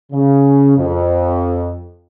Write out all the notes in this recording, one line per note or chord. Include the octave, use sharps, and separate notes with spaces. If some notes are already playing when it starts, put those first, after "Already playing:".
C#3
F2